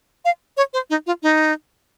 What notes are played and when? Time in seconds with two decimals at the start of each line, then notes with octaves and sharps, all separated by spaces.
0.25 F5
0.57 C#5
0.73 C5
0.90 D#4
1.07 F4
1.23 D#4